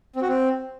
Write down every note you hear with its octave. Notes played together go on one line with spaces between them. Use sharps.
C4
F#4
C4